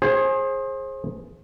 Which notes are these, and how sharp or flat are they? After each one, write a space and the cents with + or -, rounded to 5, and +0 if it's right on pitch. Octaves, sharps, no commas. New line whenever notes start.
G#4 +0 C5 +35